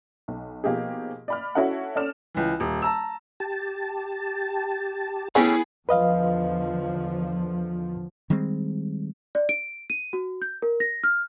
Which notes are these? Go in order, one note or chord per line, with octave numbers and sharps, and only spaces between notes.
B1
B2 F3 A#3 D#4 G4 G#4
D5 B5 F6
C#4 E4 F#4 A4 F#5
C#4 A4 D5 F6 E7
C#2 E3
D#1
A5 A#5 E6
G4 A5
A3 B3 C#4 E4 G4 G#4
E2 D3 F3 B4 D#5 F5
D#3 G3 G#3 C4
D5
D7
D#7
F#4
G6
A#4
A#6
F6